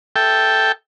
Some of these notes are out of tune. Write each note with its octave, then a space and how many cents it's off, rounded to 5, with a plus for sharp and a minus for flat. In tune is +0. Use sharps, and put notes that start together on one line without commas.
A4 +0 E5 +0 G5 +0